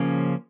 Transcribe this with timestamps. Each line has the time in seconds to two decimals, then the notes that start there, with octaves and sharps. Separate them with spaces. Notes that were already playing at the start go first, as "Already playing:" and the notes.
Already playing: C#3 F3 A#3 C#4